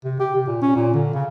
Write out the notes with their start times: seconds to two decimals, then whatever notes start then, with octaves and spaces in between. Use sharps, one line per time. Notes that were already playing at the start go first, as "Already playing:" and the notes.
0.05 C3
0.20 G4
0.35 C3
0.47 A#2
0.62 C#4
0.75 A#2
0.94 D3
1.14 C#3